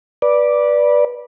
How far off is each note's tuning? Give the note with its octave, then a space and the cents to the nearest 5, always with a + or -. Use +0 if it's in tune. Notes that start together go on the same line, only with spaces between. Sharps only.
B4 -20 D5 +0